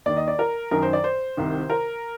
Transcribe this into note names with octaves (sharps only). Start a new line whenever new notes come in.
D#2 D#3 D5
D#5
D5
A#4
F#2 D#3 A#4
C5
D5
C5
C2 C3 D#3
A#4